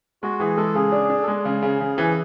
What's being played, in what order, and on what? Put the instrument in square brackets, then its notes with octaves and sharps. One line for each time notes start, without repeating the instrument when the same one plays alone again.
[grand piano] G#3 [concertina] F#4
[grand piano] E3 [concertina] G#4
[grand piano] G#3 [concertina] A4
[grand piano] C#3 [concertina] G#4
[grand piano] D4
D4
[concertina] A4
[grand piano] G#3 [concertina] G#4
[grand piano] C#3
C#3
C#3
E3